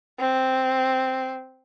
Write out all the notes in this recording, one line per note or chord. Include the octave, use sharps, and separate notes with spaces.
C4